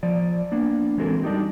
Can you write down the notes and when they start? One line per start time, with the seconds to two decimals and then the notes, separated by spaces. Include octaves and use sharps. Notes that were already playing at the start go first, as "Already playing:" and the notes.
0.03 F3 D5
0.52 A#3 B3 D4
0.98 E3 G#3 C4 F#4 A4 A#4
1.23 G3 D4 D#4 G4